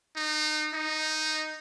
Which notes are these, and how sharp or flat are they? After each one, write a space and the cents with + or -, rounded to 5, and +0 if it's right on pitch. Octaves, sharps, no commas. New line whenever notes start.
D#4 -30
D#4 -5